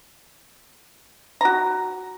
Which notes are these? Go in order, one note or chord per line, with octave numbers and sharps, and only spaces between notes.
F#4 A#5